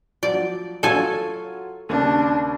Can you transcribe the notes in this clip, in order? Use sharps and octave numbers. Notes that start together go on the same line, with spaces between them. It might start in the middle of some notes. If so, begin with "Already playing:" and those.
F3 F#3 D5
F#3 F4 A4 C#5 G#5
D#2 C#3 D4